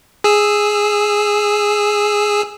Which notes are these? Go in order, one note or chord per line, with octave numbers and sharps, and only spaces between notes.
G#4 E6